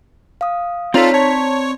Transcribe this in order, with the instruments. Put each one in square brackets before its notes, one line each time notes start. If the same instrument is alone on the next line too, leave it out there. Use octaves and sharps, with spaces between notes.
[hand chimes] F5 D#6
[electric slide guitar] C4 D5 A#5 [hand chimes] D#4 C#5 B6 [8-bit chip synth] F4 A4
[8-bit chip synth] C#5 [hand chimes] A5